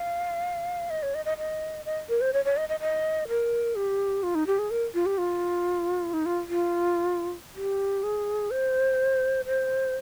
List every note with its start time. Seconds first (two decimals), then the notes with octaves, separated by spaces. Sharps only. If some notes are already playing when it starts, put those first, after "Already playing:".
Already playing: F5
0.90 D#5
1.03 C#5
1.15 D#5
1.25 D#5
1.38 D#5
1.85 D#5
2.09 A#4
2.21 C5
2.33 C#5
2.45 C#5
2.57 D#5
2.69 D#5
2.80 D#5
3.28 A#4
3.75 G4
4.23 F4
4.35 D#4
4.47 G4
4.59 G#4
4.70 A#4
4.94 F4
5.06 G4
5.18 F4
6.13 D#4
6.26 F4
6.49 F4
7.55 G4
8.03 G#4
8.51 C5
9.46 C5